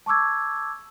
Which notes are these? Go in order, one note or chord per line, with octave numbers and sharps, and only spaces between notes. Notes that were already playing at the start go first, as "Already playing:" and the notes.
A5 C#6 D6 E6 G#6